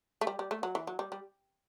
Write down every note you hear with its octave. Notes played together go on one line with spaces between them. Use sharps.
A3
G3
G3
A3
F#3
E3
F#3
G3
G3